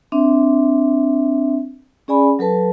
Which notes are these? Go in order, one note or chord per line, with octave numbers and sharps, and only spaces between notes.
C4 D4 E5
C#4 G#4 D5 G#5 B5
F#3 A4 B4 A5